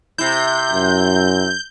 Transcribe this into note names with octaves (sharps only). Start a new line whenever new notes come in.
C3 E4 G6
F#2